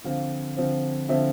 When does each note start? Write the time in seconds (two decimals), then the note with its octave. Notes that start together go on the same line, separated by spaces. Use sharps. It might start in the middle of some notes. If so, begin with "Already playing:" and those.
0.04 D3 F3 C4 F5
0.56 D3 F3 C4
1.09 D3 F3 C4 E5